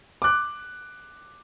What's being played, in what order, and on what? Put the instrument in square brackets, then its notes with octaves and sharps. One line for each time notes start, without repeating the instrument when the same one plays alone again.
[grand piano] D6 F#6